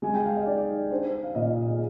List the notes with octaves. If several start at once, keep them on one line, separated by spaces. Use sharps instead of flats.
G#3 G#5
G5
F5
D#5
D#4 D5
D4 C5
F5
A#2 D#5
G#4